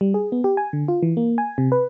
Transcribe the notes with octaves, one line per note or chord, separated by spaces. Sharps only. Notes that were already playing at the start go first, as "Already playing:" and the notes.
G3
G#4
B3
G4
G#5
D3
F4
E3
A#3
G#5
C3
B4